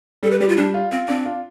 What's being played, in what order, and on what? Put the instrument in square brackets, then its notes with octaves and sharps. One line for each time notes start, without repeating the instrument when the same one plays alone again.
[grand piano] G3 [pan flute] A4
[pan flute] B4
[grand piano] G3 [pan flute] G4
[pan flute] F4
[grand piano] G3 [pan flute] D4
[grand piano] F4
[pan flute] C4 [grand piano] F4
[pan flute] C4 [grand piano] D4
[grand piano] F4